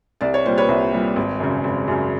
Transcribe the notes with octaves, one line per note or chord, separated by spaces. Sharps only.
C2 D5
C#5
A#2 G3 C5
B4 C#5
C2
A#2 G3
G#1
F#2 C#3
G#1
F#2 C#3